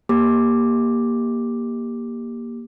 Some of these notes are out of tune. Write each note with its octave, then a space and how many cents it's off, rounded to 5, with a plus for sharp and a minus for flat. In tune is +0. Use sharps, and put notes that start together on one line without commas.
A#3 +15 G4 +10 D6 +0